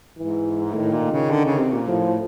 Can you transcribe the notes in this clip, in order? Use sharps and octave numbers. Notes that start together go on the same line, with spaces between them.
G#2 E3
A2 D#3
A#2
C#3
D3
C#3
C3
A#2
A2 F3